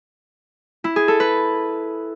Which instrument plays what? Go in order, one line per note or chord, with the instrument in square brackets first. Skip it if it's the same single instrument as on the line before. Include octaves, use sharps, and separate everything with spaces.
[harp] E4
G#4
A4
B4